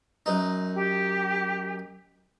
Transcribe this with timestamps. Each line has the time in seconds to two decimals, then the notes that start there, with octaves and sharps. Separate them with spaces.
0.26 F#2 D#4
0.75 G4